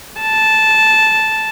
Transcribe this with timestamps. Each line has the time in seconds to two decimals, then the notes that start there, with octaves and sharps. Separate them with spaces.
0.21 A5